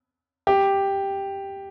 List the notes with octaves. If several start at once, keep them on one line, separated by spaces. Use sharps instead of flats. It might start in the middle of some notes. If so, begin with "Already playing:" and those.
G4